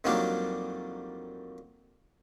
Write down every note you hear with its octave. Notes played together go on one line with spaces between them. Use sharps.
F2 D#3 F#3 G3 A#3 D4